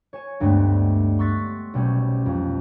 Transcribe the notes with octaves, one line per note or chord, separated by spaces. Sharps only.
C#5 G#5 E7
D2 G2 G#3 A3 B3 C4
C6 C#6 E6 F#6 A6 B6
B1 B2 G3 C4 C#4
B1 F2